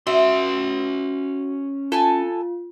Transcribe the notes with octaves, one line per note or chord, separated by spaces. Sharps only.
C#4 F#4 E5 C6
F4 A4 G#5 A5